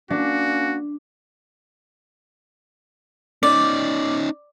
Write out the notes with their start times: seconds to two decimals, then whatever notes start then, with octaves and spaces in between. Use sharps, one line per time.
0.10 A#3 C#4 D4 F#4
3.43 C#4 D#4 D5